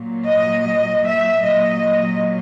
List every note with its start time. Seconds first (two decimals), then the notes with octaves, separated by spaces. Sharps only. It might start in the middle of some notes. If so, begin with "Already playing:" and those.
Already playing: A#2 F#3
0.26 D#5
1.06 E5
1.44 A#2 F#3 D#5